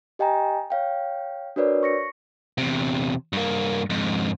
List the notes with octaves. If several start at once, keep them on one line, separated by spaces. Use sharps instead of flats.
G4 D#5 G5 G#5 A#5
C#5 F5 G5
D4 F#4 A#4 B4 C#5 D5
C#6 A#6 C#7
E2 C3
G2 A#3
F2 G#2